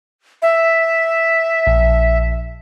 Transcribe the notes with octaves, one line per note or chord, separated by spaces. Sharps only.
E5
A#1